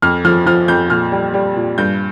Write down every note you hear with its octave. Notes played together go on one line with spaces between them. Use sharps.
F2 F6
F3 F6
F3 F6
F2 G6
A#2 F6
G3
G3
A#2
G2 G6